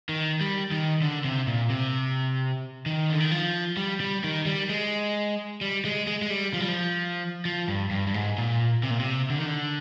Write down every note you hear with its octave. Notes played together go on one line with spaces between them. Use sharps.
D#3
G3
D#3
D3
C3
A#2
C3
D#3
D3
D#3
F3
G3
G3
D#3
G3
G#3
G3
G#3
G#3
G#3
G3
F3
G3
F3
F3
G2
G2
G2
G#2
A#2
C3
A#2
C3
D3
D#3
D3